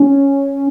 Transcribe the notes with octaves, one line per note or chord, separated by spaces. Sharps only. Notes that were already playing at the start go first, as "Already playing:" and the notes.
Already playing: C#4